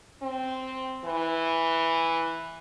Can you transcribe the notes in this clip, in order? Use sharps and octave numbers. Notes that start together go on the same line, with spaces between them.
C4
E3